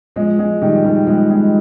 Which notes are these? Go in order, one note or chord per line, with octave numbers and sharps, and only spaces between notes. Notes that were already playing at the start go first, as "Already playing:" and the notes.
F3 G#3
F3 G#3
D#3 G3
D#3 G3
F3 G#3
F3 G#3